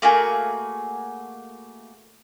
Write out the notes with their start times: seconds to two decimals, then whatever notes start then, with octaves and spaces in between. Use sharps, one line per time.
0.02 A3 A#3 F#4 G#4